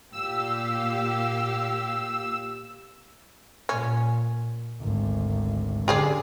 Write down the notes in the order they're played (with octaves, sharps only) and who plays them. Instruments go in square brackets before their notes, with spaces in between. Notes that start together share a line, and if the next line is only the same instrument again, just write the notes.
[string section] A#2 G4 F5 [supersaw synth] E6
[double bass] A#2 [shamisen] C#4
[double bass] G#1 D2
[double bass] F#2 D3 [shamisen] G4 G#4 D5